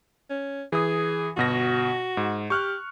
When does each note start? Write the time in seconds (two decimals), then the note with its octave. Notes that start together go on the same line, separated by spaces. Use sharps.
0.30 C#4
0.72 E3 G#4 D#6
1.37 G1 B2 F#4 A#6
2.17 G#2
2.50 G4 C#6 F6 F#6